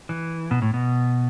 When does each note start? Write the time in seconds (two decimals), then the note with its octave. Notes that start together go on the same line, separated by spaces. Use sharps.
0.09 E3
0.51 B2
0.62 A2
0.74 B2